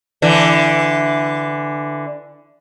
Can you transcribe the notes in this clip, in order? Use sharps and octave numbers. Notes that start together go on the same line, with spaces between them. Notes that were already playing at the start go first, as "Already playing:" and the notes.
D3 E3